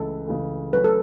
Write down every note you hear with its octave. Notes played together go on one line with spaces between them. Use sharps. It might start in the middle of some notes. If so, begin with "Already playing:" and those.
Already playing: C#2 C#3 E3 A3 A4
C#2 C#3 E3 A3
F#3 A3 C#4 B4
A4